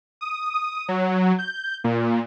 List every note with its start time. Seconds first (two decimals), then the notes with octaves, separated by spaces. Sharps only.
0.21 D#6
0.88 F#3
1.38 G6
1.84 A#2